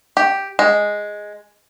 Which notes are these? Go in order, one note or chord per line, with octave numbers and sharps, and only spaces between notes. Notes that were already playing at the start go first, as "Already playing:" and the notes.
G4
G#3